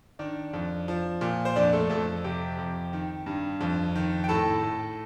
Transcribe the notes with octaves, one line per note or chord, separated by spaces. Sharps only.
D#3 D4 D5
F2
F3
A#2
C5
F2 D4 D5
A3 A4
F2 A3 A4
C3 G4 G5
F2
D#3
G2
F2
D#3
G5
A2 A4 A5
A2